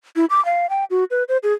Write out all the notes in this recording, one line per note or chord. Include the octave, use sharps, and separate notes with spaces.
E4
D6
F5
G5
F#4
B4
C5
G#4